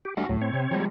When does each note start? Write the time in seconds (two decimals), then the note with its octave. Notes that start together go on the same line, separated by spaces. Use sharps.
0.05 G4
0.17 G3 A3 D4 F#4 F#5
0.29 D2 A2 F#3
0.41 C4 C#5
0.53 C3
0.71 F3 G3 G#3